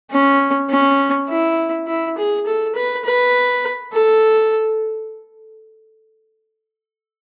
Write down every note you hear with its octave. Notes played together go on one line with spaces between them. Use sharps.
C#4
C#4
E4
E4
G#4
A4
B4
B4
A4